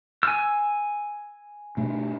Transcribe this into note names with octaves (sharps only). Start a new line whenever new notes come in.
G#5 E6
B2 A3 D4